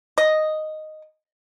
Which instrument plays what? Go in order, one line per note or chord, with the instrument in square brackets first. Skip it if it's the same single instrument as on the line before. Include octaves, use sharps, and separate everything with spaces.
[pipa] D#5